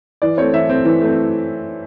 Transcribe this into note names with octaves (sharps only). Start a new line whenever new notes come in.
E3 D5
A3 C4 C#5
E3 E5
A3 C4
E3
A3 C4